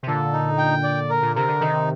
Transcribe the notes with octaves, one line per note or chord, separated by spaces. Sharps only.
C3
A#2 D3 A4
D#4
G5
D5
A#4
A#2
C3 A#4
D3
C3 D#3 D#4